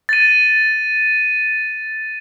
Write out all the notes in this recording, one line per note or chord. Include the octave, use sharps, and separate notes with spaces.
A6 D#7